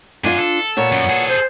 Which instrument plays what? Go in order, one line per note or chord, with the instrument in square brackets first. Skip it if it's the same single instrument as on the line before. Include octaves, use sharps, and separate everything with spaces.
[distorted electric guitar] F#2 G#5 [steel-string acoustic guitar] D4 F4
[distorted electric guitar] A4
[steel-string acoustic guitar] A#2 B3 C#5 [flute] F#5
[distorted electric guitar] F#2
G#4 A4
[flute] C5